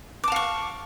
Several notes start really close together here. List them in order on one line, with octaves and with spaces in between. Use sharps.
D6 A5 F5 C#6